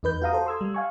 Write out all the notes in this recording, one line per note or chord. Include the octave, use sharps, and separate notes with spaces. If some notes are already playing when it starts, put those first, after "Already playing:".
E2 D#4 B4 G6
F#4 G4 F5 A#5 D#6
A4 C5
C6 E6 G#6
G3
F5 G#5 C#6